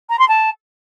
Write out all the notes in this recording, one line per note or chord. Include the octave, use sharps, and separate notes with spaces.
A#5
C6
A5